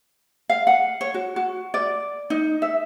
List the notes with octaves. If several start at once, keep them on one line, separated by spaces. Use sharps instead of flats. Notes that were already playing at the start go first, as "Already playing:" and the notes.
F5
F#5
C#5
F#4
F#4
D5
D#4
E5